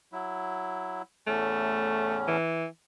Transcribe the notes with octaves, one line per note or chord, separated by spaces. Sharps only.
F#3 E4
E2 A2 A3 C#4
E3